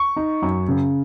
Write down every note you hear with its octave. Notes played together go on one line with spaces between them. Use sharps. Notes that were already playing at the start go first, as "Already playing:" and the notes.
Already playing: C#6
D#4
F#2
C#3